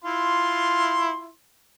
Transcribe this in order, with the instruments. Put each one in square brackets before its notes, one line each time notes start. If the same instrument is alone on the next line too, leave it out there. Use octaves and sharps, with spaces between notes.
[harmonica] E4 F4 C6